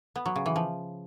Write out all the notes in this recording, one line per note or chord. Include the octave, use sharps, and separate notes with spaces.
B3
F#3
C#3
E3
F3